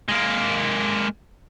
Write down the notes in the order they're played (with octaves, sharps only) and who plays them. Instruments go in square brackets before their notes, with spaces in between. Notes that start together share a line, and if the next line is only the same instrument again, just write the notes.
[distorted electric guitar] G#3 A#3